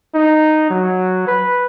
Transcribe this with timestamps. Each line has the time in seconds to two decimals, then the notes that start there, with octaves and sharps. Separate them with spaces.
0.15 D#4
0.70 F#3
1.27 B4